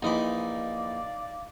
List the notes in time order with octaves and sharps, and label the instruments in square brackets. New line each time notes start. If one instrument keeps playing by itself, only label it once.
[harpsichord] A#1 E3 B5 [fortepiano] D#4 [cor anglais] D5 [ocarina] F5